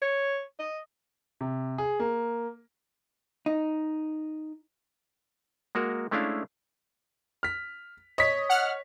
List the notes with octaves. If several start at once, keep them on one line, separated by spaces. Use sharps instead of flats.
C#5
D#5
C3
G#4
A#3
D#4
G#3 A#3 F#4 A#4
G#3 A3 C#4 D4 E4 F5
F6 B6
C#5 D#5 B6
F#5 F6